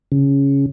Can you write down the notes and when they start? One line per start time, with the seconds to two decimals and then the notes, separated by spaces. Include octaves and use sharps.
0.12 C#3